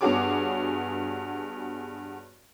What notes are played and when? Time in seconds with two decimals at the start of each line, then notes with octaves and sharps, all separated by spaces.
0.01 G2 B3 F#4 G#4 C#5 D6